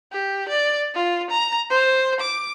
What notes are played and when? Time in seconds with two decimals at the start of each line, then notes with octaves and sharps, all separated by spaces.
0.12 G4
0.49 D5
0.95 F4
1.31 A#5
1.70 C5
2.21 D6